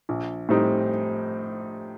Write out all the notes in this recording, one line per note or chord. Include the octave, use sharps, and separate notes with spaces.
A#1
A2 G3 C4 D#4